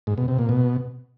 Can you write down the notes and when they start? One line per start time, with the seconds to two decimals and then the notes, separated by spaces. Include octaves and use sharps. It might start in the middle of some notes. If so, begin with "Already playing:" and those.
0.07 G#2
0.18 B2
0.28 C3
0.39 A#2
0.49 B2